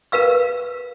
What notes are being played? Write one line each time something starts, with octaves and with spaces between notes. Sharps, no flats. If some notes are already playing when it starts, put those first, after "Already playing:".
A#4 B4 F5 E6